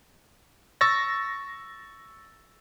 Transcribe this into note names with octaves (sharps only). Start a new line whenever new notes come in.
C#6 E6 A6 A#6